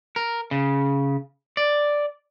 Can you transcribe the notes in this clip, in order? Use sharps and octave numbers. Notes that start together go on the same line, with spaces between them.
A#4
C#3
D5